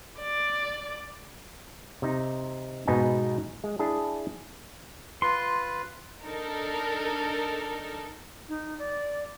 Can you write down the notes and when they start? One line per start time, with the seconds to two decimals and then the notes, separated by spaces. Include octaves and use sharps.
0.20 D5
2.02 C3 D#4
2.87 G#2 B2 B3 D#4 G#5
3.64 G#3
3.79 D4 E4 G#4 A5
5.22 F4 B4 C6
6.23 D4 D#4 A4 A#4
8.49 D#4
8.79 D5